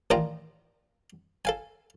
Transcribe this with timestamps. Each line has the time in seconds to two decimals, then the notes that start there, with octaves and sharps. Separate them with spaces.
0.10 A1 D#3 D4 F4 A#5
1.45 A4 F5 G#5